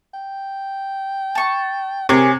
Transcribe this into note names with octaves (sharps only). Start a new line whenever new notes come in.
G5
A5 C#6
C3 G4 G#4 A#4 C#5